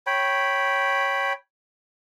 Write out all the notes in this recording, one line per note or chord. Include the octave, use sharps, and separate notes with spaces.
C#5 G5 B5